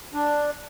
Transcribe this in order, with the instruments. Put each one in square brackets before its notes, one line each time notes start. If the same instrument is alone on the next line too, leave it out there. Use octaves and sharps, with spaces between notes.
[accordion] D4